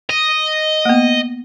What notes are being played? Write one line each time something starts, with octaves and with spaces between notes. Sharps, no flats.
D#5
A#3 B3